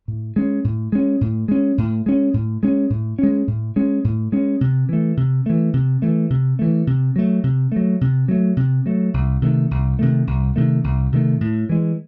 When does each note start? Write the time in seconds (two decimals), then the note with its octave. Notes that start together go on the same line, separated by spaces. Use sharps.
0.08 A2
0.36 G#3 C#4
0.64 A2
0.92 G#3 C#4
1.21 A2
1.48 G#3 C#4
1.78 A2
2.06 G#3 C#4
2.34 A2
2.63 G#3 C#4
2.90 A2
3.19 G#3 C#4
3.47 A2
3.76 G#3 C#4
4.04 A2
4.32 G#3 C#4
4.61 C3
4.89 E3 A3
5.17 C3
5.46 E3 A3
5.73 C3
6.02 E3 A3
6.30 C3
6.59 E3 A3
6.87 C3
7.16 F#3 A3
7.43 C3
7.72 F#3 A3
8.01 C3
8.28 F#3 A3
8.57 C3
8.86 F#3 A3
9.14 C2
9.42 C3 D#3 A3
9.71 C2
9.99 C3 D#3 A3
10.27 C2
10.56 C3 D#3 A3
10.84 C2
11.12 C3 D#3 A3
11.41 A2
11.69 E3 G#3